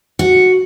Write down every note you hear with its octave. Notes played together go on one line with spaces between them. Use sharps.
F#4